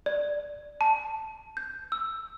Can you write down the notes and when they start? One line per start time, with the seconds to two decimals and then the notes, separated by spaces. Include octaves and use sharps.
0.06 D5
0.81 A5
1.57 G6
1.92 E6